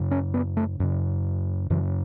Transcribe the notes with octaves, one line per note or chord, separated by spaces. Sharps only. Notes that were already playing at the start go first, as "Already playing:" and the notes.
Already playing: F#2 C#3
C#4
B3
A3
F#2 C#3
F#2 C#3 E3